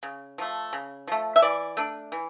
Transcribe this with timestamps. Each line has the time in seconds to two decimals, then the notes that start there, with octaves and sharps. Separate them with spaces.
0.03 C#3
0.38 F3 A3
0.73 C#3
1.07 F3 A3
1.36 E5
1.42 E3 D5
1.77 A3 D4
2.12 E3